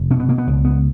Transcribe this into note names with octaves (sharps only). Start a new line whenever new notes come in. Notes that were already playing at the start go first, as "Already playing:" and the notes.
Already playing: F1
B2 C#4
B3
B2 A#3
B3
C#2
C#2 B3